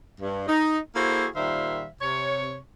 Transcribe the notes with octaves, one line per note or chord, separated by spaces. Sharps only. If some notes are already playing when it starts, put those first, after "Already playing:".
G2
D#4
A#3 E4 F#4 G#4 A4 C5
A#2 D#3 G3 C5 E5 F5
C3 C#5